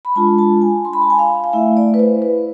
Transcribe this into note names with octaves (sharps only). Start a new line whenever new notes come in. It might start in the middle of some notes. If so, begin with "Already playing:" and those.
B5
G#3 D4 F4 A5
A5
G#5
C6
B5
A5
G#5
F5
F5
A3 E4 E5
D5
B4
C5
B4